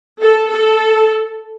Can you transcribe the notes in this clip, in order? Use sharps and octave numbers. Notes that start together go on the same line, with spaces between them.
A4
A4